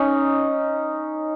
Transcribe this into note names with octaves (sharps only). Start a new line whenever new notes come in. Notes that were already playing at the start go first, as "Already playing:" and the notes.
Already playing: C#4 D#4